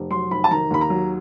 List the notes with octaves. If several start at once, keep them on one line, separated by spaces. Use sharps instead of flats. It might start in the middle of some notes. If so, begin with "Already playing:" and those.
Already playing: F1
F#3 C6
F1 B5
A5
D#3 A#5
D#2 B5
A#5
F#3